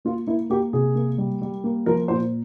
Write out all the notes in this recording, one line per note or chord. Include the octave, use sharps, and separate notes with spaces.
A#3 F4
A#3 E4
A#3 G4
C3 G#4
A#3
G3
G3
A#3
F3 A#4
A#2 C5